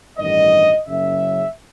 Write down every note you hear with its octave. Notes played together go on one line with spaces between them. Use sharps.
A1 G2 D#3 G3 D#5
F#1 F#2 C#3 F#3 E5